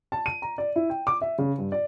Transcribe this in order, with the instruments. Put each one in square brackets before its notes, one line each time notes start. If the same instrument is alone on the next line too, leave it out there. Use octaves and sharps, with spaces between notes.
[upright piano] A5
D#7
A#5
D5
E4
G5
D6
E5
C#3
G2
D5